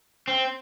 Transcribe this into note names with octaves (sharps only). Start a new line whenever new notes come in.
C4